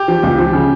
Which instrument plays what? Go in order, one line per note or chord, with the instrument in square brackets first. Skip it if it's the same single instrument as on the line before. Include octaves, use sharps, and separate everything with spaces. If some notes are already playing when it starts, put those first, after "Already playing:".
Already playing: [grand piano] G4
[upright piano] F3
C#2
F3
C#3